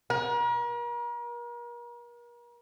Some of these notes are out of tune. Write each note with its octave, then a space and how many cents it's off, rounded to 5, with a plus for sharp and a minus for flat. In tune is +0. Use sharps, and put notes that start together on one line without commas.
A#4 +40